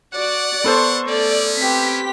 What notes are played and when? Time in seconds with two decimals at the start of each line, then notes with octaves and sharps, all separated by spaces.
0.14 F#4 D5 F#5
0.64 B3 A4 C5 C6 C#6
1.07 A3 C#4 D5
1.57 C4 G4 B4 B6